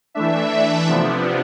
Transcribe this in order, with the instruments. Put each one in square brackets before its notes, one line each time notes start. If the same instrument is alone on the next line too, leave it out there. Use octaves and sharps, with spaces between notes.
[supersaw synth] E3 A3 D4 E5
C3 F3 B3 D4